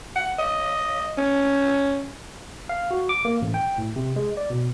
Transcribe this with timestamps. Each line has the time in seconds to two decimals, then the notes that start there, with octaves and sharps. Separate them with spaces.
0.16 F#5
0.39 D#5
1.18 C#4
2.69 F5
2.91 F#4
3.09 D6
3.25 A#3
3.41 A1
3.54 G5
3.78 A2
3.96 C3
4.16 G#3
4.37 D5
4.50 B2